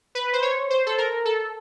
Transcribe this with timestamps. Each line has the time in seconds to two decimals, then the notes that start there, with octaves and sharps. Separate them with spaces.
0.15 B4
0.33 C5
0.42 C#5
0.70 C5
0.86 A4
0.98 A#4
1.25 A4